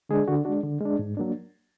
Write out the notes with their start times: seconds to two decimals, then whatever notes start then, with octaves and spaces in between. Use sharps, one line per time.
0.09 D3 G#3 D4 G#4
0.28 D3 F#4
0.45 G#3 D4 F#4
0.63 D3
0.81 G#3 D4
0.99 G#2
1.17 F#3 A#3 D4